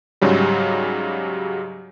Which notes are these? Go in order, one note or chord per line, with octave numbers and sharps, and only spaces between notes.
G#2 C#3 F#3 G3